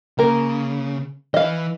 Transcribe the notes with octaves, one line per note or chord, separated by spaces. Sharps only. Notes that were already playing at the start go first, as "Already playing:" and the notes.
C#3 A#3 A#4
E3 D#5 F5